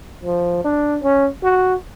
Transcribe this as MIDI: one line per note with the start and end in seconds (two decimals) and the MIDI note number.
0.23 0.60 53
0.64 0.98 62
1.03 1.28 61
1.43 1.74 66